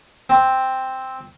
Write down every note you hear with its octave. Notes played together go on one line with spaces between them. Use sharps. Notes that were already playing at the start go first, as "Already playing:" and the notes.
C4